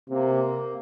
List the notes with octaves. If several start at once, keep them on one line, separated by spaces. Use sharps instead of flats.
C3 A#3